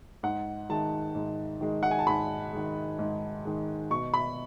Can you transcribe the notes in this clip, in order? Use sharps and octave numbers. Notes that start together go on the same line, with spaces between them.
G#2 F#5
D#3 G#3 A5
G#2
D#3 G#3
F#5
G#5
A5
G#2 B5
D#3 G#3
G#2
D#3 G#3
B2 C#6
B5